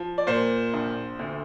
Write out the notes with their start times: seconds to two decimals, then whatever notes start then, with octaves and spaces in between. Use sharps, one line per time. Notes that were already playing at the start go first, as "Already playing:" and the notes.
Already playing: F3
0.18 D5
0.27 A#2 C5
0.73 A#1
1.19 D2